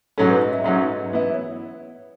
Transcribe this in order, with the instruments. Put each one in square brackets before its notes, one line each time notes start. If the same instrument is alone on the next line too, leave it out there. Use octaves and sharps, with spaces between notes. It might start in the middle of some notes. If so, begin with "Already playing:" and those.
[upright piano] G#2 F#3 C#4 [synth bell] A4
[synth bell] B4
D#5
E5
[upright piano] G#2 F#3 C#4 [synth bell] F#5
[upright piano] E3 B3 E4
[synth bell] C#5